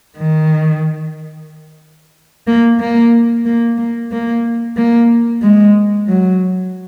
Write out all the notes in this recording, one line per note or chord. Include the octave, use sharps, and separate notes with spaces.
D#3
A#3
A#3
A#3
A#3
A#3
A#3
G#3
F#3